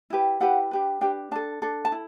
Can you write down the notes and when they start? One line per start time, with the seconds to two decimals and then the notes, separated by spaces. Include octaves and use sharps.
0.10 E4 G4 B4
0.40 E4 G4 B4 F#5
0.71 D4 G4 B4
1.01 D4 G4 B4 G5
1.31 D4 A4 A5
1.62 D4 A4
1.85 A5
1.92 E4